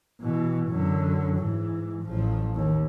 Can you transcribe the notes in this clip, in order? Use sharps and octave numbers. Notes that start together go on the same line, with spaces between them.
B2 E3
F#2 D3
G#2 E3
A1 F3
D#2